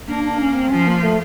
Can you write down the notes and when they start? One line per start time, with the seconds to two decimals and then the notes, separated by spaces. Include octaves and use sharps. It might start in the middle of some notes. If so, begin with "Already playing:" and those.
0.08 A#3 D4
0.24 D4
0.40 C#4
0.55 C4
0.70 F3 C#4
0.87 A#3
1.03 A3